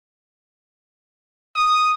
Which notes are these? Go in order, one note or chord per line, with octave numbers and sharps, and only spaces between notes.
D#6